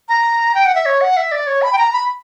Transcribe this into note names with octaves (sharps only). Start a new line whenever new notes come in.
A#5
G5
F#5
E5
C#5
F#5
E5
D5
C#5
B5
G5
A#5
B5